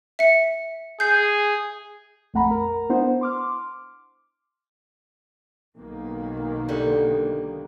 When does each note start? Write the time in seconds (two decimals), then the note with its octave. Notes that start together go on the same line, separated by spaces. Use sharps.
0.19 E5 C#7
1.00 G#4 G6 C7
2.34 A#1 F2 A3 F#5 A#5 B5
2.51 A#4 A#5
2.90 B3 D4 E4 C5 F#5
3.21 C6 D6 F6
5.76 B1 D#3 A#3
6.68 D3 G3